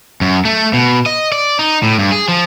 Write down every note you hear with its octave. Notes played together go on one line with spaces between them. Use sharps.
F#2
A3
B2
D#5
D5
D#4
A2
G2
G#4
F3